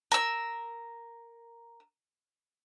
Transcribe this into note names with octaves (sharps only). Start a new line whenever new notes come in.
A#4 E6